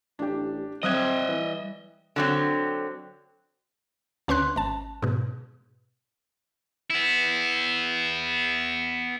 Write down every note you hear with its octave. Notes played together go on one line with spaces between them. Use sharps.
A1 D4 G4
G3 C4 D#5 E5 D#6 F#6 G#6
E3
D3 F#3 C4
D2 C#4 B4 C6 F#6
G#1 A5
G#2 B2
B3 E4